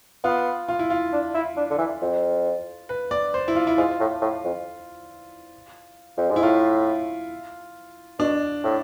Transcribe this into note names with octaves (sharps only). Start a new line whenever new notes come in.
B3 F4
F4
E4
F4
D4
E4
D4
D3
E3
F2
B4
D5
C5
E4
F4
E4
G#2 F4
A2
A2
F2
F2
G#2
E4
A2 F4
B2 D4
A2